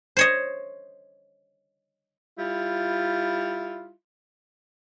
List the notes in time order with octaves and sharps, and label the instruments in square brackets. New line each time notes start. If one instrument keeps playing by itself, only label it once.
[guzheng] C5 C#5 D#5
[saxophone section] G3 E4 F4